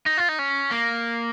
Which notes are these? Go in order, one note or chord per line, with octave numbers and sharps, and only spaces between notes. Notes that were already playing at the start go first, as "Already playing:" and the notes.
D#4
F4
D#4
C#4
A#3